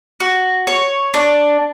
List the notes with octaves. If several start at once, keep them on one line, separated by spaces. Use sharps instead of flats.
F#4
C#5
D4